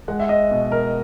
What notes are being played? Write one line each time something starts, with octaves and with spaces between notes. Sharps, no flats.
G#3 F#5
E5
D#5
B2
A#4